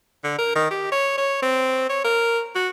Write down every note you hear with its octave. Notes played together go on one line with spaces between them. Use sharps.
D3
A#4
D#3
G4
C#5
C#5
C4
C#5
A#4
F#4